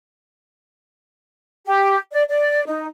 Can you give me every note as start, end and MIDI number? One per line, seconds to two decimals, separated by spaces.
1.65 1.97 67
2.12 2.23 74
2.29 2.62 74
2.66 2.84 63